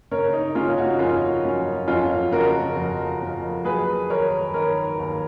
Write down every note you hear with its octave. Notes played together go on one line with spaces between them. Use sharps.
C#3 A#4 C#5
D#4
C#3 C#4 F4
F4
D#4 F#4
F2 C#4 F4
F#3 C#4
F2 C#4 F4
C#3 F#4 A#4
F2
F2
F#3 G#4 B4
D#2 A#4 C#5
D#3 A#4 C#5
D#2